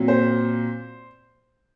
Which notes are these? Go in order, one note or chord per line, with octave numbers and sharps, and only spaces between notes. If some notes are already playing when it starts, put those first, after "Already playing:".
Already playing: A#2 F#3 C4
C5